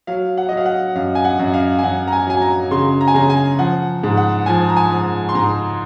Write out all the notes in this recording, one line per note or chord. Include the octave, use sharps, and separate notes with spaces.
F#3 F5
F#5
F#3 D#5
F5
F#5
F#2 F5
G#5
F#5
F#2
F5
G#5
F#2 F#5
A#5
G#5
F#3 G#5
A#5
C#3 C6
A#5
G#5
C#3 A#5
G#5
F3 F#5
G#2
F#5
F3 G#5
A#5
G#5
F3
C6
G#2 A#5